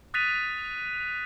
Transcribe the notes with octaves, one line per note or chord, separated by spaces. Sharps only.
D#6 F#6 A6 B6 D#7 F7